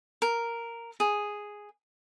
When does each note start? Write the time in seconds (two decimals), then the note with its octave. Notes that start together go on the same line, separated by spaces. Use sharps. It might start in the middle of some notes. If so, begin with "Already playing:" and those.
0.22 A#4
1.00 G#4